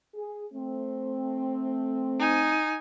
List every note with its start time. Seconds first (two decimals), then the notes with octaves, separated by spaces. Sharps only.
0.15 G#4
0.53 A3 C4
2.19 D#4 G#5